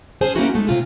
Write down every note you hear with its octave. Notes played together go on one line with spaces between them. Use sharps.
C#4 G#4 C5 G#5 A5
A#3 C4 C#4 D#4 E4 F#4
G#3 A3 D#4
C3 F4 G#4